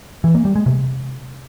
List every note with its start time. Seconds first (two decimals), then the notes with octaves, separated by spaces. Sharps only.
0.24 E3
0.35 A#3
0.45 G3
0.56 G#3
0.66 C3